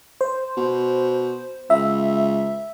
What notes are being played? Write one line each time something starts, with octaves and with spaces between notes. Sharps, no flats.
C5
B2
C#2 E5